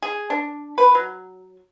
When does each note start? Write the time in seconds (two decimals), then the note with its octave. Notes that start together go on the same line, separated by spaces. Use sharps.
0.02 G#4
0.30 D4
0.78 B4
0.95 F#3